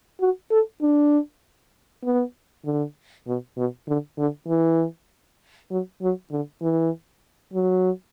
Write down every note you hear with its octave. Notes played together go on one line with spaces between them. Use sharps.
F#4
A4
D4
B3
D3
B2
B2
D3
D3
E3
F#3
F#3
D3
E3
F#3